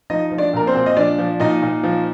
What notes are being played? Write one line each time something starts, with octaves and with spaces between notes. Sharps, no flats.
F3 D#4 D#5
F3
D4 D5
A#2 A#4
C4 C5
A#2
D#5
F3 D4 D5
F3
A#2 D#4 D#5
A#2
F3